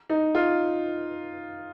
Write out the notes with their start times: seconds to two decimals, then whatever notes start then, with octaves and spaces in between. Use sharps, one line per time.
0.10 D#4
0.35 F4